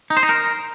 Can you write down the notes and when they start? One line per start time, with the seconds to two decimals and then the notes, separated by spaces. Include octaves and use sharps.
0.10 D#4
0.17 C5
0.23 D#4
0.29 A#4